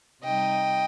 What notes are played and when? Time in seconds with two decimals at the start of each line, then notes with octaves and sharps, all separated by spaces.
0.23 C3 G3 D#4 D#5 G5